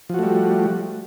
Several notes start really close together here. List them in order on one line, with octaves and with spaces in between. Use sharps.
F3 F#4 A3 G3